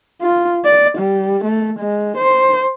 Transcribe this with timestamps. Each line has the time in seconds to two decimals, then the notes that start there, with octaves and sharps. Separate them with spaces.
0.22 F4
0.65 D5
0.98 G3
1.44 A3
1.79 G#3
2.17 C5